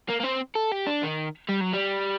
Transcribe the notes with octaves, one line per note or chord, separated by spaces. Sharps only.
A#3
A#3
C4
A4
G4
D4
D#3
G3
F#3
G3